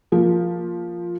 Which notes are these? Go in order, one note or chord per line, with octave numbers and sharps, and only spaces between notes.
F3 A#3